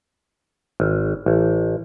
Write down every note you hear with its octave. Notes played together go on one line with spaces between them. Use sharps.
G#1
A1